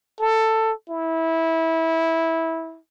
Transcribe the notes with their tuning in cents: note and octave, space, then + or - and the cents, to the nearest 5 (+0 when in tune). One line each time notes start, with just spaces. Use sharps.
A4 +15
E4 -15